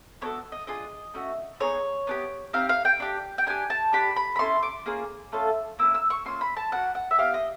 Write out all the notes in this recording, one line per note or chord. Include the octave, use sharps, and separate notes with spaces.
B3 D4 F#4 A4 C#5
D#5
D4 F4 G#4 D#5
A3 C#4 F#4
B3 D#4 G#4 C#5
B3 D4 G4
C4 D#4 G4 F5
F5
G5
D4 G4
G5
D4 G4 G#5
A5
D4 G4 B5
B5
B5
C#4 E4 A4 C6
D6
A#3 C#4 F4 G#4
A3 C#4 F4 A4
A#3 C#4 E4 E6
E6
C#6
A#3 C#4 F4 C6
B5
A5
A#3 D4 F#4 F#5
F#5
E5
B3 E4 G4 F5
D#5